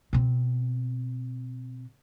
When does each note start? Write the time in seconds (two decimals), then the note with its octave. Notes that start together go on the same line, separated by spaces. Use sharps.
0.13 B2 C4